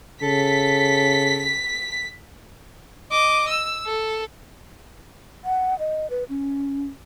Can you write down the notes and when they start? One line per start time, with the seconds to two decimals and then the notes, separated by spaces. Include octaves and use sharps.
0.22 C#3 A4 B6
3.11 D#5 D6
3.49 E6
3.86 A4
5.45 F#5
5.79 D#5
6.10 B4
6.29 C#4